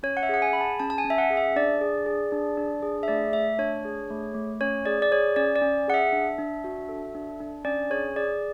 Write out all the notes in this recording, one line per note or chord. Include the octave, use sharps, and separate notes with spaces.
C#4 C#5
F#5
E5
G#4 F#5
G#5
G#4 B5
A5
C#4 A5
A5
G#5
C#4
E5
F#5
G#4
E5
D4 D5
G#4
G#4
D4
D4
G#4
E5
A3 D5
A3 E5
D4 C#5
G#4
A3
A3
C#4 C#5
G#4 D5
D5
G#4 C#5
C#4 D5
D5
C#4
G#4 F#5
E5
D4
D4
F#4
A4
D4
D4
C#4 D5
G#4 C#5
G#4 D5